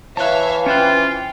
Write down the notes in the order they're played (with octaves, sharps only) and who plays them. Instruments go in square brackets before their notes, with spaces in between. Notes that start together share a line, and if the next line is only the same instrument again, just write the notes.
[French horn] E3 [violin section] C#5 E5 F5 [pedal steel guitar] A5 F#6
[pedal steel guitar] C#4 C5 F#6 [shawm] F4 [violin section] G5